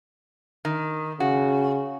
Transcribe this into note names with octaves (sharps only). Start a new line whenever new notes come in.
D#3
C#3 F#4